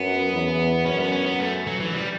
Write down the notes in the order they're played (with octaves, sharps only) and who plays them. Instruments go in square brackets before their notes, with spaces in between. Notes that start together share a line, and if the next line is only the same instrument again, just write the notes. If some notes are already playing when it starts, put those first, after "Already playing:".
Already playing: [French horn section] F#2 [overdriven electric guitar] B3
[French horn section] E2
[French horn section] F#2 [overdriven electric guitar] C#4
[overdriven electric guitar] B3
C#4
B3
A3
F#3
E3
G3